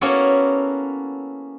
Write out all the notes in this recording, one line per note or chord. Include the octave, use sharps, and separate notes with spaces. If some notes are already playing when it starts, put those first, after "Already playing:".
A#3 B3 C#4 E4 F#4 A4